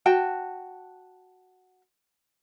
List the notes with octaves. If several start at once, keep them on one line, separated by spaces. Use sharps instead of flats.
F#4 G5 A5